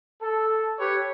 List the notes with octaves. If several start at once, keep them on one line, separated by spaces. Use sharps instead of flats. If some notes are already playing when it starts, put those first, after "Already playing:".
A4
G4 B4 C#5